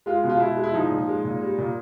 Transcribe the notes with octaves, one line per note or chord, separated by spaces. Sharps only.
G#3 F4
B2
F4
B2 E4
G#3
E4
F3 D#4
A#2
G#3
A#2
G3
A#2